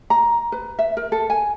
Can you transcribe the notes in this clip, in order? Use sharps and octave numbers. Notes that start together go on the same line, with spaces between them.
A#5
B4
E5
A#4
A4
G#5